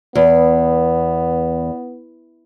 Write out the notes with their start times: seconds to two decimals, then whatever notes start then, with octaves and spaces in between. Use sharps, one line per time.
0.15 E2 B3